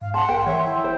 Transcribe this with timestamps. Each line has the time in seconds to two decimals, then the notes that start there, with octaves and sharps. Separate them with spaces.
0.01 G#2 F5
0.14 F#5 A5 C6
0.29 A1 A#4 G5
0.46 E3 C#5 E5
0.64 E4 G5
0.84 F#1 C5